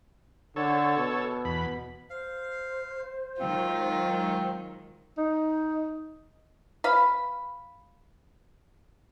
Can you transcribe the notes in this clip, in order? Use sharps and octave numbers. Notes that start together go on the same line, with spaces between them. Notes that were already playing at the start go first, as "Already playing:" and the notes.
D3 A4 C#5
B2
E2 B5
C5 F5
D#3 F#3 G#3 C4 F4
D#4
B4 F5 B5